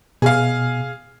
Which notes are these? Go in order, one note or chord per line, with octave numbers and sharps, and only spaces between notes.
B2 G#4 F5